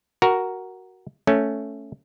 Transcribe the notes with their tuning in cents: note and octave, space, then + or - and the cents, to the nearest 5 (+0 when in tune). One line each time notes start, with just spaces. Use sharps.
F#4 +10 A#4 +0
A3 +0 C#4 +0